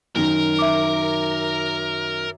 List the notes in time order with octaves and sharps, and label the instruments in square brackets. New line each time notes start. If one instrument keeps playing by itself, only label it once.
[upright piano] F#2 D#3 [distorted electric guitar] A#4
[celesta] E5 D6